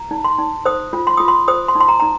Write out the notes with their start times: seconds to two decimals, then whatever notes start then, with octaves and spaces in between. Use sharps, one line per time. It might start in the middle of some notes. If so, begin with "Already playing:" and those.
Already playing: A#5
0.11 D#4
0.25 C6
0.39 D#4
0.66 C5 D#6
0.93 F4
1.07 C6
1.17 F4 D#6
1.28 C6
1.48 C5 D#6
1.68 C6
1.75 D#4
1.80 C6
1.89 A#5
2.00 D#4 A#5